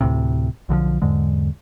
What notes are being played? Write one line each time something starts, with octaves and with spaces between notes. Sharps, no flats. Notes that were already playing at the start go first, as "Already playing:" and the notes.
D2 A2 C3
B1 D3 D#3 F3
E2 G#2 D3 G#3